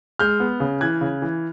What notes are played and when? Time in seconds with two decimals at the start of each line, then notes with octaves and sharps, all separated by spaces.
0.19 G#3 F6 G6
0.40 B3
0.60 C#3
0.81 E3 F#6 G#6
1.01 C#3
1.22 E3